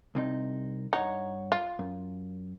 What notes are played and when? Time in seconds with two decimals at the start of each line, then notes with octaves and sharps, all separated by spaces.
0.15 C2 C3 D#4
0.93 G2 D#4 C#5 F#5
1.52 F4
1.79 F#2